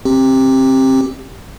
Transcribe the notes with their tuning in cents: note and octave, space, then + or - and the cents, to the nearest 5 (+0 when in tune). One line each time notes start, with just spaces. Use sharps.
C4 +25 G4 +0